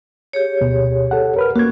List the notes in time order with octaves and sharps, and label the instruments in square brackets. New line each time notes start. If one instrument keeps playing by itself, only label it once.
[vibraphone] G4 G#4 C#5
[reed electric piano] D2 B2
A4 F#5
A#4 B4 F6
[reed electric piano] A#3 G#6 [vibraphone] C#4 F#4